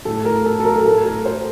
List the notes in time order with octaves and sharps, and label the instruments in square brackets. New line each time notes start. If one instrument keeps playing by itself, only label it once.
[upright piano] A2 A4
A#4
A4
A4
A#4
A#4
A2 A4
A#4
C5